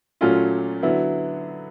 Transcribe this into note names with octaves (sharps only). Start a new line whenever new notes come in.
A#2 F#3 A3 C#4 F4
D3 F#3 B3 E4